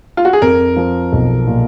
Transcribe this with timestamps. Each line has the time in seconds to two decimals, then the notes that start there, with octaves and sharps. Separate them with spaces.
0.17 F4
0.25 F#4
0.33 G#4
0.42 F2 A#4
0.76 F3
1.12 B1
1.47 A#2